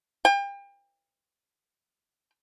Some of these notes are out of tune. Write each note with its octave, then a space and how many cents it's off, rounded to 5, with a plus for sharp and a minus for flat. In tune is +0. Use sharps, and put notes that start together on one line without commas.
G5 +35